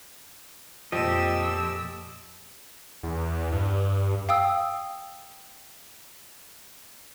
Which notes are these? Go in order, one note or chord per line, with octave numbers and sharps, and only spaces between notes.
F2 A#2 F3 G4 D#5 E6
E2
G2
F5 G5 D#6 E6